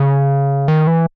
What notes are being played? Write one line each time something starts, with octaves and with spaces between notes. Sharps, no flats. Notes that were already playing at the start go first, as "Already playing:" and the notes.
Already playing: C#3
D#3
E3